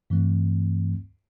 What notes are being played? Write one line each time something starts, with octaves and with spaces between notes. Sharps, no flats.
G2 E3 A3 C4